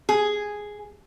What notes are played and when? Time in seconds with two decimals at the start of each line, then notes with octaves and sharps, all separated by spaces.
0.09 G#4